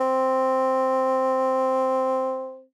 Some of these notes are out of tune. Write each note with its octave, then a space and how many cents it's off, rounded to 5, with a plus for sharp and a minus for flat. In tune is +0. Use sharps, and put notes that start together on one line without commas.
C4 +0